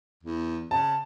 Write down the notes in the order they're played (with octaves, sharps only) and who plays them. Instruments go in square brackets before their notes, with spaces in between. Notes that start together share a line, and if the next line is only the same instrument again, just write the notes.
[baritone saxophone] E2
[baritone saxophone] C#3 [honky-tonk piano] A5